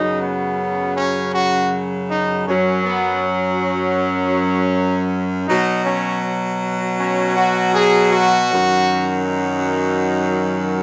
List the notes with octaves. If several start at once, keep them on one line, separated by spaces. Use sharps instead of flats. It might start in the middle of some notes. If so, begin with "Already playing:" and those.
Already playing: F#2 C#3 F#3 D#4
B3
C#4
F#4
D#4
F#2 F#3 C#4
B3
C#4
B2 F#3 D#4
C#4
C#4
F#4
G#4
F#4
F#2 D#3 F#3
D#4